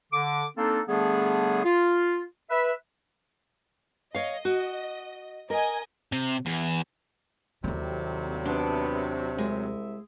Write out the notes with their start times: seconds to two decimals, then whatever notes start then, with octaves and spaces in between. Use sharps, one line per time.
0.12 D3 D6
0.57 A#3 C4 D4 D#4 A4
0.88 D3 G3 A3 B3 D4 G#4
1.65 F4
2.50 B4 E5
4.15 C#5 D#5 F5
4.45 F#4
5.50 A#4 D#5 G#5
6.13 C3
6.46 E2
7.64 D#2 A2 C3 D#3 F#3 G3 A#3
8.45 B3 D4 C5
9.38 C2 G#3 E5